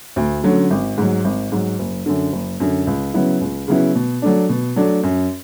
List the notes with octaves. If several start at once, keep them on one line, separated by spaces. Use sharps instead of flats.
D2
D3 F#3 A3 C#4
G#1
G#2 F#3
G#1
G#2 F#3
F#1
F#2 D3
F#1
F#2 D3
C#2
C#3 F#3 B3 E4
C#2
C#3 F#3 B3 E4
B2
F#3 A3 D4
B2
F#3 A3 D4
F#2